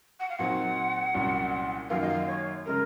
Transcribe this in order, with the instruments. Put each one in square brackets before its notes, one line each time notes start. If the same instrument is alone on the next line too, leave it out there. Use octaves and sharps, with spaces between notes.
[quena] F#5
F5
[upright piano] A#2 F#3 C4 D#4 [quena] F#5
[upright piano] C2 A#2 F#3 C#4
[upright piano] F#2 D#3 F#3 A#3 F4 [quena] F5
[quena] D#5
F5
C#5
[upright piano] C#3 G#3 [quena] A#4